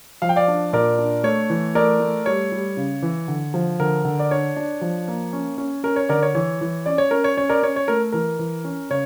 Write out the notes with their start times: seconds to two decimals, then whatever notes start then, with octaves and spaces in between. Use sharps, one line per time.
0.22 F3 F5
0.29 G5
0.36 D5 F5
0.48 D4
0.73 A#2 A#4 D5
0.98 D4
1.24 A3 C#5
1.50 E3
1.75 A3 A#4 D5
2.00 A3
2.26 G3 C#5
2.52 G3
2.77 C#3
3.02 E3
3.28 D3
3.54 F3
3.80 D3 A#4
4.05 D3
4.19 D5
4.31 D4 C#5
4.56 D4
4.81 F3
5.08 A#3
5.33 C#4
5.58 C#4
5.83 C#4 A#4
5.96 C#5
6.09 D3 A#4 D5
6.23 C#5
6.35 E3 C#5
6.61 E3
6.86 C#4 D5
6.98 C#5
7.11 C#4 A#4
7.24 C#5
7.37 C#4 C#5
7.49 A#4 D5
7.63 C#4 C#5
7.76 C#5
7.88 A3 A#4
8.12 E3 A#4
8.39 E3
8.65 C#4
8.90 C#3 C#5